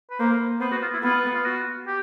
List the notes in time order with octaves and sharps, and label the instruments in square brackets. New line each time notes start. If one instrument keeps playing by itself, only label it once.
[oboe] B4
[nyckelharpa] A#3 [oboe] C5
[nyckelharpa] B3 [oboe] C5
[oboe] F#4
F4
E4
[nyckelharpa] B3 [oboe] F4
[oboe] F4
F#4
G4